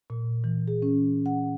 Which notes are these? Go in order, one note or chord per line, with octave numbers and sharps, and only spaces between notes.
A#2
E3
G#4
C#4
F#5